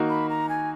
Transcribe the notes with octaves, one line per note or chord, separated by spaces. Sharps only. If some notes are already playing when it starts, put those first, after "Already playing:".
Already playing: D#3 A#3 D#4 F#4
B5
A#5
G#5